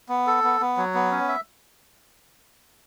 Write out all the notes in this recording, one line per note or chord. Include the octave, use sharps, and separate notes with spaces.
B3
A4
B3
B3
F#3
B3
C#4
E5